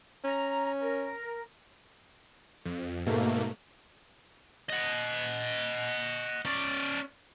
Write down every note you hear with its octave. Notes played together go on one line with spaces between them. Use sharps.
C#4 A#5
A#4
F2
G#2 B2 A3 A#3
D#5 F#5
C#4 D5